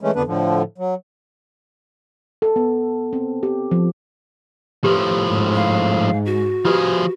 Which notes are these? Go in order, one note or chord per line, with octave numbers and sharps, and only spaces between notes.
E3 G#3 A3 C#4
F2 D3 B3 D4 B4
A2 D3 F3
F#3
A4
B3
C4
G4
F3
A2 F3 G4 B4
G#2
F5
F#4
F3 F4 G4 G#4 B4